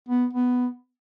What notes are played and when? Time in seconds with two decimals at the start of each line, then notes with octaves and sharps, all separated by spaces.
0.09 B3
0.33 B3